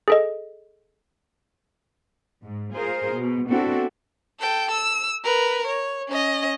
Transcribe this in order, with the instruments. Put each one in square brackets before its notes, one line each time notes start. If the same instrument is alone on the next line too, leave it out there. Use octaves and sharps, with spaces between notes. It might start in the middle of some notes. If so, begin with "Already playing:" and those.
[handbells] G#4 A4 D#5
[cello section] G#2
F4 G#4 A#4 C5
B2
B3 C4 D4 E4 F#4 A4
[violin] A4 G5
E6
A#4 B4
C#5
C#4 D#5